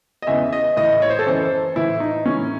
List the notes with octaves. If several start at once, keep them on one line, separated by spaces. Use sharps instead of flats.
D#5
E2 C#3 E3 E5
D#5
A2 E3 D#5
C#5
C5
A4
F#2 E3 C5
A2 E3 E4
D#4
A2 E3 C#4